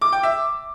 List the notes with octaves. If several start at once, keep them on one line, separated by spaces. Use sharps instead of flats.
D6
G5
E5